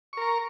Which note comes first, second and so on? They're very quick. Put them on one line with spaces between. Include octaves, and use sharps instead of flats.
C#6 A#4 A#5